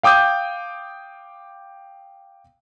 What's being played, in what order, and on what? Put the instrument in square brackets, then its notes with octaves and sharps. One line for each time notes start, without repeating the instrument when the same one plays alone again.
[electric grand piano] F5 G5 D6 D#6 G6